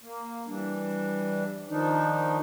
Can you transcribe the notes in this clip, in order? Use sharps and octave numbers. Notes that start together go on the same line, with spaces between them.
A#3
E3 G3 D4
D#3 F3 D4 D#4